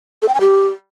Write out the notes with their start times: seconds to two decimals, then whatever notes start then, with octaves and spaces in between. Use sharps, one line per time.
0.22 A4
0.28 G5
0.34 G#5
0.41 G4